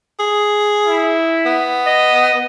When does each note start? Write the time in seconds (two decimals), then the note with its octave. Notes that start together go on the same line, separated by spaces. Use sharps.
0.20 G#4
0.87 E4
1.46 B3
1.88 D#5